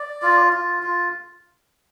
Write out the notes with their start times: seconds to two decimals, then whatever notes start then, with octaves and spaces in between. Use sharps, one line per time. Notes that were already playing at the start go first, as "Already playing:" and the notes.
Already playing: D5
0.22 F4
0.53 F4
0.83 F4